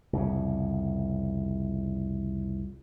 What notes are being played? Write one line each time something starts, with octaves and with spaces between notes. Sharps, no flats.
C2 F2 C#3